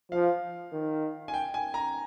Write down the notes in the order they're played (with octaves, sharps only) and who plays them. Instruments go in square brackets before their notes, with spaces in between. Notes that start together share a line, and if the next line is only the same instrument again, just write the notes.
[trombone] F3 [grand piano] F5
[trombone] D#3
[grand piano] G#5
G5
G#5
A#5